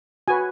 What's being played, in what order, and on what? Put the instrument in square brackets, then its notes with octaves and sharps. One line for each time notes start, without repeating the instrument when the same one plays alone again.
[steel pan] F#4 B4 G#5